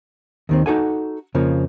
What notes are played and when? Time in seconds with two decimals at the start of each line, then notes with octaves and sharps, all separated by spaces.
0.49 D#2 D#3 C4
0.66 D#4 F#4 A4 F#5 G#5
1.34 F2 C#3 F3 A#3